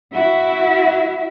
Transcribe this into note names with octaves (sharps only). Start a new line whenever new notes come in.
E4 F#4 E5